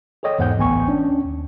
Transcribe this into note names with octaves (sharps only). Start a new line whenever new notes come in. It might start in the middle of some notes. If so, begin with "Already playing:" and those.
G#4 A4 C#5 D#5 G5
E2 G#2 C5 F#5 G5 G6
A1 D2 B3 G5 G#5 C#6
C#4 D4
D#2